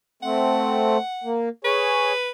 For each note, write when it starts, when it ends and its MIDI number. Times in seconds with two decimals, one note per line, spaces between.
0.23 0.98 57
0.23 0.98 60
0.23 1.34 78
1.24 1.49 58
1.65 2.12 68
1.65 2.30 71
1.65 2.12 73